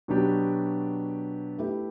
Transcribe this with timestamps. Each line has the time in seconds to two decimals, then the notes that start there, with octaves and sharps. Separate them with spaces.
0.08 B2 F#3 B3 D4 G4
1.58 A3 E4 G4 B4